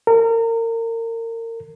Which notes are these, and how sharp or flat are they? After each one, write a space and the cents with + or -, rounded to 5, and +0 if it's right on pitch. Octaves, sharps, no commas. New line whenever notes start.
A#4 -30